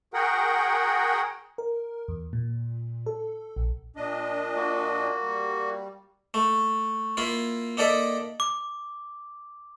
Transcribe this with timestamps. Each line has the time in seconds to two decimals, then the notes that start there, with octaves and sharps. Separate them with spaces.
0.14 F#4 G#4 A#4 F#5 G5
1.58 A#4
2.08 E2
2.33 A#2
3.06 A4
3.56 A#1
3.96 A#2 D4 D#5
4.56 A#3 F#4
5.22 G3
6.34 A3
7.17 A#3 E4 F4
7.77 A#3 D#4 A4 D5 E5
8.40 D6